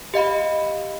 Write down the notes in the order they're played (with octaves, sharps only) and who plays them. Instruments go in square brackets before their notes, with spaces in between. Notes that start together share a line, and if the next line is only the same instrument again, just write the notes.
[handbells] G4 D#5 F5 B5